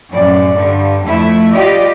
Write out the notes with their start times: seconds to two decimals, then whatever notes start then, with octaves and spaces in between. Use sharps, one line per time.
0.11 F#2 A2 D5
0.52 G2 D3
1.04 F2 A3 E4 E5
1.51 G3 F4 G4 D5 D#5